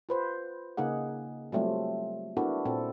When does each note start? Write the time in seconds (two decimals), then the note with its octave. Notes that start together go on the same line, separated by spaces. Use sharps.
0.09 F4 B4 C5
0.77 C#3 A#3 D#4 G#4 F#5
1.52 F#3 G3 A3 C4 F4
2.37 B3 D4 E4 F#4 A4 A#4
2.65 A#2 C4 A4